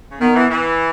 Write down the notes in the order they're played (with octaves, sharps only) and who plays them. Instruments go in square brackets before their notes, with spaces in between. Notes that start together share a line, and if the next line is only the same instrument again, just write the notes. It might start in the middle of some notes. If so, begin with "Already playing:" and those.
[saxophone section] C#3
[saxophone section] D#3 [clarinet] B3
[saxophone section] E3
E3